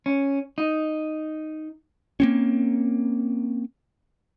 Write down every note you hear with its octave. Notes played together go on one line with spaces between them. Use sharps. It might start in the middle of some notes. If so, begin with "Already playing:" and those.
C#4
D#4
A#3 C4 C#4